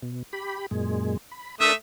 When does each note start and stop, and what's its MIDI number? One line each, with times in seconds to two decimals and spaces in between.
0.02 0.23 47
0.33 0.66 67
0.33 0.66 83
0.71 1.17 42
0.71 1.17 46
0.71 1.17 56
1.31 1.55 83
1.60 1.73 57
1.60 1.73 62
1.60 1.73 70
1.60 1.73 76
1.60 1.73 81
1.60 1.73 87